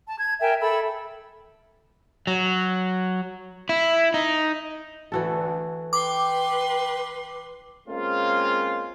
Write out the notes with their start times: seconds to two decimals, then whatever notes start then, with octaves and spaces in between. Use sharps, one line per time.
0.07 A5
0.19 G#6
0.41 A#4 E5 G5 G#5
0.61 A4 E5 B5 E6
2.27 F#3
3.69 E4
4.14 D#4
5.12 D2 E3 F#4 A4
5.93 B4 G5 C6 D6
7.88 G#3 A#3 C4 C#4 F4